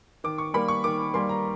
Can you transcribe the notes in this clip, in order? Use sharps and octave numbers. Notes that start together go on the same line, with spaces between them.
D#3 D6
C#6
G3 A#3 B5
C#6
D#3 D6
G3 A#3 C6
A#5